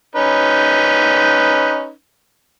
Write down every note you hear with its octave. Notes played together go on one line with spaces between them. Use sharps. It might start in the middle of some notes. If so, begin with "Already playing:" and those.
C#4 D#4 B4